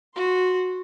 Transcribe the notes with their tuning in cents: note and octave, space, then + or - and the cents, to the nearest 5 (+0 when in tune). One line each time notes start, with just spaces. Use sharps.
F#4 -10 C6 +0